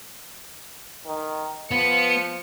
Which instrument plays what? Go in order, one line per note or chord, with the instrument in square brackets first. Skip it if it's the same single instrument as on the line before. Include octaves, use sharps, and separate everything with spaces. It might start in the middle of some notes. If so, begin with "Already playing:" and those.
[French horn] D#3
[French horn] F3 [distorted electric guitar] B3 [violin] C#7